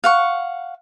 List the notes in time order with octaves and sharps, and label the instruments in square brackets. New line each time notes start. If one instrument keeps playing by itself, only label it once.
[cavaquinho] F5 F#5 C#6